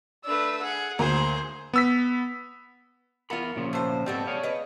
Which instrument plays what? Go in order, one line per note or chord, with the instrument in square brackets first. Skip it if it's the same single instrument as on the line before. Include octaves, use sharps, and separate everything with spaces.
[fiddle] A3 D4 [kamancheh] B4 E6
[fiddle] G#4 [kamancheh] F#5
[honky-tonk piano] D2 A#3 A#5 [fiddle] G#4 C5
[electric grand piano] B3 E6 B6
[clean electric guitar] E2 F#5 B5 [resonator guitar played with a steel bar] F4 A#4
[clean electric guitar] A#2 C#3 F3
[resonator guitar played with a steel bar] A2 C5
[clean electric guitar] G#2 C4 [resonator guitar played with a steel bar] G3 A3 B3
[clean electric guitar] G#4 C#5 F5
[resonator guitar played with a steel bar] B4 D#5